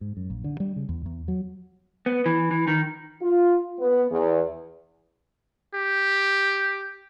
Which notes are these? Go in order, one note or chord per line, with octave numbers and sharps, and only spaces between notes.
G#2
F#2
A#1
D3
G3
C#3
E2
E2
F#3
B3
E3
E3
D#3
F4
B3
E2
G4